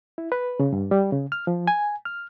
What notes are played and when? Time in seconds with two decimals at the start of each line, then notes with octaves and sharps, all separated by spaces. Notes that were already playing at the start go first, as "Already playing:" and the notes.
0.18 E4
0.32 B4
0.60 C#3
0.73 G2
0.91 G3
1.13 C#3
1.32 F6
1.47 F3
1.68 G#5
2.05 F6